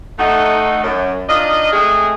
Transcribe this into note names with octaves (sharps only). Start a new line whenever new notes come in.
A3 D#4 F#4
F#2
D4 D#4 F4 D#5
G#3 A3 C4 G#4